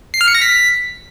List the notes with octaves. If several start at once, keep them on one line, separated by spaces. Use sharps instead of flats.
C7
F6
C#7
A#6
B6